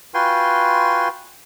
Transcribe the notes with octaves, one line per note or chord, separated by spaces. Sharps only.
F4 F#4 B4 G5 G#5 C6